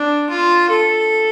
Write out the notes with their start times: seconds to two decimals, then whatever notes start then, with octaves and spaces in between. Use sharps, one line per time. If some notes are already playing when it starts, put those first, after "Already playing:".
Already playing: D4
0.29 F4
0.69 A4